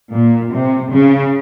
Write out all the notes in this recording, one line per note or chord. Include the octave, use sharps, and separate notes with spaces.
A#2
C3
C#3